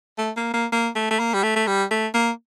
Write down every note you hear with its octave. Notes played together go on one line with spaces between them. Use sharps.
A3
A#3
A#3
A#3
A3
A3
A#3
G3
A3
A3
G3
A3
A#3